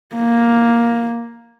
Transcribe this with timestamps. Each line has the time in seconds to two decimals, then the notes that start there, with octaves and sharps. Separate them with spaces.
0.16 A#3